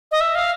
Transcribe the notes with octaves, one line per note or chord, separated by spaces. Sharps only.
D#5
E5
F5